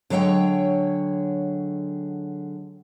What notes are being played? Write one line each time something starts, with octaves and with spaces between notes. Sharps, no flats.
D3 F#3 G#3 C#5 F5 G5